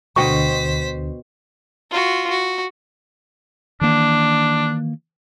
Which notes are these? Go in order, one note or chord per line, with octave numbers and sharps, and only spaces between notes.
D2 B2 D3 C5 D#5 G5 C#6 B6
F4 F#4
F#4
D#3 E3 A#3 D4